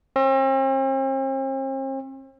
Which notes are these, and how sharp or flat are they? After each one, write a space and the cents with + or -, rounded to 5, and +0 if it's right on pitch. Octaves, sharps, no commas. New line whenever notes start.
C4 +45